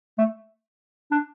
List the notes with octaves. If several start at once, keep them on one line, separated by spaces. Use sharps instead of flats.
A3
D4